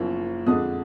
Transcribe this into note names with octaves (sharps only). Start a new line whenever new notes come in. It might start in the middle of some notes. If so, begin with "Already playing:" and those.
Already playing: F#1 F#2 F3 A#3
F2 D3 G#3 D4 D#6